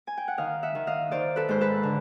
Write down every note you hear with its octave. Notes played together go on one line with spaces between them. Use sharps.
G#5
G5
F#5
D#3 D#5 F5
E5 F#5
D#3
D#5 F5
D#3 C5 D5
A4 B4
G#2 C5
A4 B4
D3